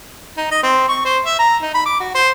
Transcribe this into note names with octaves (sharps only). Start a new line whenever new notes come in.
D#4
D#5
C4
C#6
C5
E5
A#5
D#4
B5
D6
F#4
C5